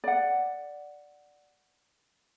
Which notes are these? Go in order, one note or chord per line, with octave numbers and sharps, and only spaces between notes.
D5 F#5